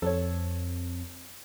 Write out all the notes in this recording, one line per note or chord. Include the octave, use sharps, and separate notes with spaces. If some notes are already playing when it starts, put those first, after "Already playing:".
F2 C4 A4 C#5